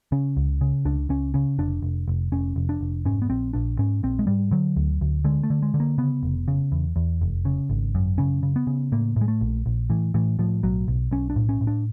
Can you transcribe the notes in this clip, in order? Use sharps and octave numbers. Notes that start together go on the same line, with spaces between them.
C#3 C#4
C#2
C#3
C#2 D4
C#2 C#4
C#3 C#4
F1 D4
F1
F1
F1 C#4
F1
D4
F1
G#2 C#4
B3
A#1 C4
A#1 D4
G#2 C#4
A#1 C4
G#3
G#2 G3
D3 F#3
D2
D2
D3 G#3
A3
D3
G#3
D3
A#3
C#3 B3
F1
C#3
E2
E2
F1
C#3
G#1
F#2
C#3 C#4
C#3
B3
C#3
A2 A#3
A2 G#3
A3
A#1
A#1
A2 E3
A2 E3
A2 F3
B1 F#3
B1
B1 C#4
D4
A2
C#4
A2
D4